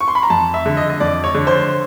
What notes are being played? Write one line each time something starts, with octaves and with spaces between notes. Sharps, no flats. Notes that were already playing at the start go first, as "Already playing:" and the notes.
C#6
C6
B5
A#5
F2 A5
E5
D3
D#5
D#5
F2 D5
C#5
D3
C5